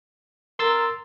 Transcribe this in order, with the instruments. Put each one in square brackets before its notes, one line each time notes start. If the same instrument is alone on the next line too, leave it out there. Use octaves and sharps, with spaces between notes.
[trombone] A#4 [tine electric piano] C6 E6 A6